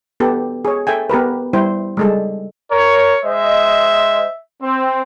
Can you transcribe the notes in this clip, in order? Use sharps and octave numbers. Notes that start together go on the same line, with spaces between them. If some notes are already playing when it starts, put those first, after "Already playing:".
B3 G4 A4
G#4 C#5
A4 E5 G5 G#5
B3 G4 A#4 B4
G3 E4 C5 G5
G3 G#3 A4
A#4 C#5
G#3 C5 D#5 E5
C4